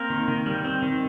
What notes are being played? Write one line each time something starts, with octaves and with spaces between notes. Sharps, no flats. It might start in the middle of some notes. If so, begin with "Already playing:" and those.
Already playing: A#3 C4 A#4
D#3
D#3
G3
C4
D#3